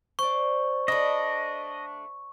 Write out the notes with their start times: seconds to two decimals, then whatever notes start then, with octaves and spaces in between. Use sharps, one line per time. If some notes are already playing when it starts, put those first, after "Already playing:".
0.19 C5 D5 C#6
0.88 A3 D4 D#5 A5 B5